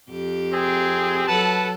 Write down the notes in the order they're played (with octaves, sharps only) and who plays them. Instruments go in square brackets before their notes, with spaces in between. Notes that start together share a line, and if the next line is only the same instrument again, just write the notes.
[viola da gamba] F2 G4
[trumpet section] C4 G#4
[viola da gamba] F#3 A4 [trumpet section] B4 F#5 A5